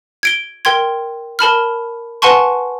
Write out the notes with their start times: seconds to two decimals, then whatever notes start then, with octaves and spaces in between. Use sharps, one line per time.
0.23 G#6 D7 G7
0.65 A#4 G5 C6 G#6
1.39 A#4 A5 B5 F6
2.22 B4 F#5 G#5 A5 C6 C#6